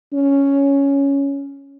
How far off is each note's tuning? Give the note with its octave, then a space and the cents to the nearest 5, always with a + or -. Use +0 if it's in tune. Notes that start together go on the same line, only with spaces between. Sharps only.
C#4 +5